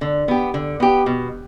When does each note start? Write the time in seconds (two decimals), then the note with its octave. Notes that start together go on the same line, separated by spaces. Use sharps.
0.01 D3
0.28 B3 G4
0.54 D3
0.80 B3 G4
1.06 B2